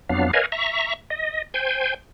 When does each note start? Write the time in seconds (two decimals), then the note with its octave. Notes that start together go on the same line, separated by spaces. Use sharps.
0.09 F2 F#3 B3 D4 F5
0.33 A#4 B4 C#5 D#5 F5 G#5
0.52 E5 A#5 C#6
1.10 D#5
1.54 C5 G5 G#5